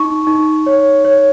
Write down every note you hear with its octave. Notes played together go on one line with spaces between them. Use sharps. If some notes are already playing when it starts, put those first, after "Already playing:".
Already playing: D#4 C#6
D#4
C#5
C#5